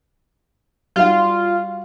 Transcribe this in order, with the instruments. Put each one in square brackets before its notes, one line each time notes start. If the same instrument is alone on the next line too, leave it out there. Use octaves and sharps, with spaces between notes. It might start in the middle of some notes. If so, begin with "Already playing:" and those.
[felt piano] G3 F#4 F5 [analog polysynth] F4